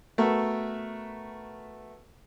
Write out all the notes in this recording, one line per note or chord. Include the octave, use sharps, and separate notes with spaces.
A3 B3 F#4 A4 A#4